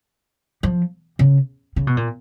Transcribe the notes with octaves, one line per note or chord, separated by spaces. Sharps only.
F3
C#3
C#3
B2
A#2